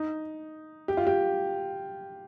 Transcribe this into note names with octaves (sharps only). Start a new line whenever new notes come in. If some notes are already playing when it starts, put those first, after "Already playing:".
Already playing: D#4
G4
F4
G4